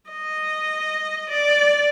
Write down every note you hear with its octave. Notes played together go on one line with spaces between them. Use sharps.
D#5
D5